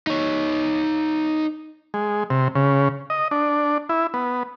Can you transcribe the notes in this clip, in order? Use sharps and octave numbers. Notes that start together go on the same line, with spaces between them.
D#4 C#5
G#3
C3
C#3
D#5
D4
E4
B3